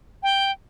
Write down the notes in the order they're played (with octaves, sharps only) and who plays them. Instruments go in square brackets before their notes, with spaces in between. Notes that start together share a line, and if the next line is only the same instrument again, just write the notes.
[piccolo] G5